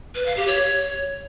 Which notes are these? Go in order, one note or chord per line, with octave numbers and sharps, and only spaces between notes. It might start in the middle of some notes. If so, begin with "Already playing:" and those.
B4
F5
G4
C#5